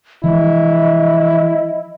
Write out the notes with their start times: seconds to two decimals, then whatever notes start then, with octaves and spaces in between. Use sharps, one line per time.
0.24 E3 F3 G#3 E4 D#5